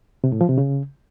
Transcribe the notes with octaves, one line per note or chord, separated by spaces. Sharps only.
C3
A2
F3
C3
C#3